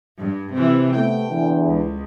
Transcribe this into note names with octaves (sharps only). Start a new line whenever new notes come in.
G2
C3 E3
A3 B3 G5
E2 D3 E3
C#2